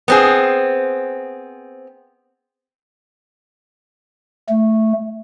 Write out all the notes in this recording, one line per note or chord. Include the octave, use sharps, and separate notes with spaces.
B3 C4 G#4
A3